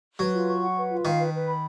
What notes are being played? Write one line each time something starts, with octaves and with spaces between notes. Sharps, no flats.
F#3 B4
F4
C#6
F#5
B4
F4
D#3 F5
B4
B4
B5